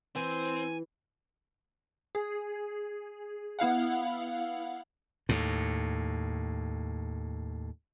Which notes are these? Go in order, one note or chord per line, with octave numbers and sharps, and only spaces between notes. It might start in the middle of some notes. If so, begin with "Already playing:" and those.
E3 C4 C5 G#5
G#4
B3 E4 F5 F#5
D#2 A2